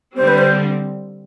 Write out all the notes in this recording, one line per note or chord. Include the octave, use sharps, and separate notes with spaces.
D3 G3 C4 C5
B4
C5